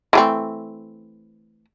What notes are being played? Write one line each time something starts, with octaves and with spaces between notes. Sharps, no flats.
E3 A3 C4